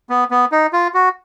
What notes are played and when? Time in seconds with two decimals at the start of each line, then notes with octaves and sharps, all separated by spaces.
0.09 B3
0.31 B3
0.52 D#4
0.73 F4
0.94 F#4